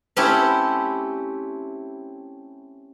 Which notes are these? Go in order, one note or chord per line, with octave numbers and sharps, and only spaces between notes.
A3 C4 C#4 E4 G4